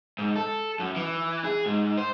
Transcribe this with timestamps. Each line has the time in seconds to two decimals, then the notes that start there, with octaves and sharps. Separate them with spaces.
0.19 G#2
0.36 A4
0.79 F#2
0.96 E3
1.44 G#4
1.66 G#2
1.97 C5